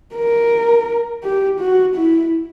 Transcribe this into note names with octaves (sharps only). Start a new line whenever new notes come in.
A#4
G4
F#4
E4